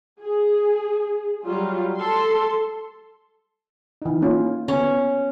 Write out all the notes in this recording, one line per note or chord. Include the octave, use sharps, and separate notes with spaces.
G#4
F#3 G3 F4
A4 C6
E3 D#4
A#3 C#4 F4
B3 C#4